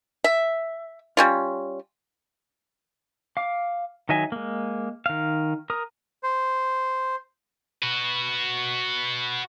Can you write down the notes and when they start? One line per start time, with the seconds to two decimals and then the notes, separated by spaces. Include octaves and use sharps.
0.24 E5
1.17 G3 C#4 F4
3.37 F5 D6
4.09 D#3 F#3 D#5 E5 G#5
4.32 G#3 A#3
5.06 D#3 F5
5.70 A#4 A#5 D#6
6.23 C5
7.82 F#4 B4